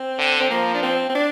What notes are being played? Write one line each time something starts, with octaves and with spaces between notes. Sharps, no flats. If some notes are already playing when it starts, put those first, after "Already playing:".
Already playing: C4
D3
C4
F3 A#3
D4
C4
C4
D4